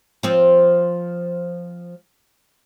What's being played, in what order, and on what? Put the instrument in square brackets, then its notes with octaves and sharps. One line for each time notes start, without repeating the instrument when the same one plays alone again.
[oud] F3 C4